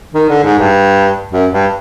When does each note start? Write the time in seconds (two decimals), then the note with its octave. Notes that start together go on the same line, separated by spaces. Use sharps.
0.14 D#3
0.29 D3
0.43 G#2
0.58 G2
1.32 F#2
1.52 G2